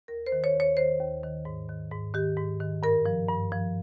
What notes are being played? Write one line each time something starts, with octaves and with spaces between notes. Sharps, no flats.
D#2 A#4
C5
D#3
C#5
D#2
C#5
D#3 C5
D#2
D#3
G#2
D#3
G#2
D#3 G4
G#2
D#3
G2 A#4
F3
G2
F3